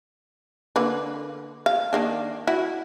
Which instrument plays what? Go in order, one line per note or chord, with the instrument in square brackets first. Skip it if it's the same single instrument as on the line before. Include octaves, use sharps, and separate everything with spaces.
[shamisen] D3 A#3 B4
F5
D#3 A#3 D4
E4 F#4